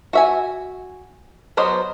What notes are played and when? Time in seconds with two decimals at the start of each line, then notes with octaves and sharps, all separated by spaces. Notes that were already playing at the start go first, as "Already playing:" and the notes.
0.13 F#4 E5 G#5
1.57 F#3 B3 C5 D#5